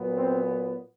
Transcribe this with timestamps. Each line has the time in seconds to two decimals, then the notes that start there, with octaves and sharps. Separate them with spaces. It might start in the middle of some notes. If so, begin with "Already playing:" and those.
Already playing: A#2 F#3 B3
0.15 C4